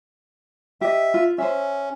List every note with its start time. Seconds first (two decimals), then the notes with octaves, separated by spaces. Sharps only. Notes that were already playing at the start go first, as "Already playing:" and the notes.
0.81 G4 D#5 E5
1.14 F4
1.38 C#4 C5 E5